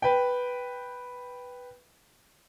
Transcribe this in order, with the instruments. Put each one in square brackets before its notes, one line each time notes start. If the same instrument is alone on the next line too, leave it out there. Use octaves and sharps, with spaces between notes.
[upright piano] B4 G5